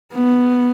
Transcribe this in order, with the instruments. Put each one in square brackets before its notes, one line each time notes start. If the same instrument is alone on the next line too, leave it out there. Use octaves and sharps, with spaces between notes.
[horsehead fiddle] B3